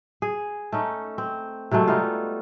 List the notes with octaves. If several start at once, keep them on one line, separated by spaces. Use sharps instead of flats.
G#4
A3 C#4 D#4
C4
C3 F#3 G#3 A3
G3 B3 D#4 F4